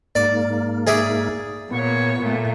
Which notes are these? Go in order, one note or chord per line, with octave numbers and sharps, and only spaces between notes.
G#2 A#3 D5
G#4 D5 E5
A#2 B3 C#5
A#2 A3